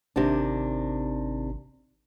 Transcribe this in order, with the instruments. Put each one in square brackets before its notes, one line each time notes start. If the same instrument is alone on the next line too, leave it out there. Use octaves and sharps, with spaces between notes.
[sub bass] G#1 [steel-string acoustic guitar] C3 D#3 D4